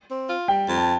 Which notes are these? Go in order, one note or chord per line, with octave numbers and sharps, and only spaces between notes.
C4
F4
G3 G5
F2
A5